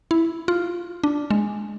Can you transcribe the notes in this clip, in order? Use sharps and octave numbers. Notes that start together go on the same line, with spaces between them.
E4
F4
D4
G#3